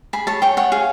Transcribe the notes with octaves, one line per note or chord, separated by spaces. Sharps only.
G#4 B5
C#5 A5
C#5 G5
C#5 F#5
G#4 F5